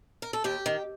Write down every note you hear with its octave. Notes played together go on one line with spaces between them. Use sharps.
A#4
A4
D#2 G4
D#3